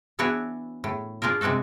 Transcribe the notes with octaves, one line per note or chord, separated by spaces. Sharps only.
E3 B3 D4 E4 F#4 C#5
A2
D4 F4 G#4 A#4
C3 G#3 D4 F#4 A4